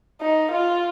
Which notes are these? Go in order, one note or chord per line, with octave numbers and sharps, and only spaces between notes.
D#4
F4